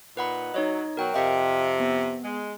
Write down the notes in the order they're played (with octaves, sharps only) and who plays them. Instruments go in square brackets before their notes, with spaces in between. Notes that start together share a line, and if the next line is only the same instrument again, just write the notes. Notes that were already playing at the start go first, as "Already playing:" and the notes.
[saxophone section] A#2 D#4 [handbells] B4 F#5 B5
[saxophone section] F#3 [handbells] D#4 C#5 D#5
[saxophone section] B2 F#3 [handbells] A#4 G5
[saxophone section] F2 C3 [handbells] D#5 F5 G5
[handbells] B3
[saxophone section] G#3